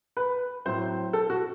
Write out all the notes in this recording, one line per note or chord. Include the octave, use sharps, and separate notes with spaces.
B4
A2 F#3 C4 C5
A4
F#4